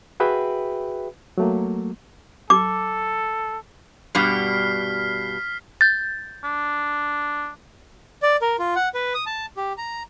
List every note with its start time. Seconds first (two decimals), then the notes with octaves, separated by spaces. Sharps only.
0.20 F#4 G#4 B4 E5 G5 B5
1.38 F#3 A3 A#3
2.50 A4 D6
4.15 G2 B2 G3 F6 B6 C7
5.81 G6 A6
6.44 D4
8.23 D5
8.42 A#4
8.59 F4
8.76 F#5
8.94 B4
9.15 D#6
9.26 A5
9.57 G4
9.78 A#5